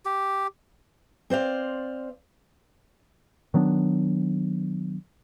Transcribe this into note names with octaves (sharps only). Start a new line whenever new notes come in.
G4
C4 C5 D5 F5
D#3 F#3 B3 D4